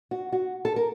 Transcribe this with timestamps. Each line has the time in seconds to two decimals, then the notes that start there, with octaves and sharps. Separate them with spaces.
0.11 F#4
0.32 F#4
0.65 A4
0.76 A#4